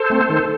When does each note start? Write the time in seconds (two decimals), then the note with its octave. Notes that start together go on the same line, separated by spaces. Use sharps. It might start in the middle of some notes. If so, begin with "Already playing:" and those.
Already playing: A4 C5
0.10 A3 C4
0.29 D#3